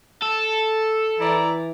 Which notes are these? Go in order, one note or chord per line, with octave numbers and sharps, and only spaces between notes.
A4
E3 E4 D5 A#5